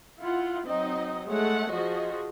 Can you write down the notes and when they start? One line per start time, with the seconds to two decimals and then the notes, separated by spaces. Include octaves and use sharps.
0.20 E4 F4 F#5
0.65 F#3 C4 D#4 D#5
1.28 G#3 A3 C#5 F#5
1.71 F3 F#4 G#4 D#5